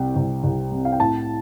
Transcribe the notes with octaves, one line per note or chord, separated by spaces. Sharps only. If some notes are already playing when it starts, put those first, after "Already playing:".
Already playing: C2 C3 G5
C2
C2
C3
F5
G5
A2 A5